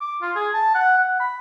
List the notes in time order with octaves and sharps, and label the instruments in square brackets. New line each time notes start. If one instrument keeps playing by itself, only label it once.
[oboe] D6
F4
G#4
A5
F#5
F#5
B5